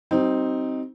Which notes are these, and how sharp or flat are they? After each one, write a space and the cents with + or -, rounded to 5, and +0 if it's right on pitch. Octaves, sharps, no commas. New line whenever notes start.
G3 -45 C4 +0 D#4 +0